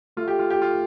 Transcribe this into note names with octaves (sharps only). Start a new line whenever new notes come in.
A3 F4
G4
F4
G4
F4